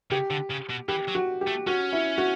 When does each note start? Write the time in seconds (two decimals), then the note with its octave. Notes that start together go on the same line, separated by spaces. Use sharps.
0.11 C#3 G4
0.30 D3
0.50 C#3
0.70 B2
0.88 E3 G4
1.08 F#3
1.15 F#4
1.41 G4
1.47 A3
1.67 C#4 F#4
1.93 E4
2.18 F#4